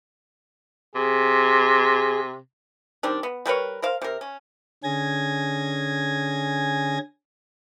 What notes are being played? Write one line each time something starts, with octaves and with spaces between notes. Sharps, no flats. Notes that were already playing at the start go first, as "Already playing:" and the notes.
C3 G#4
D#3 G3 C4 D4
B3
G3 A#4 B4 C#5
A#4 C5 F5
C3 A#4
C#4
D3 C#4 G#4 G#5 G#6 A#6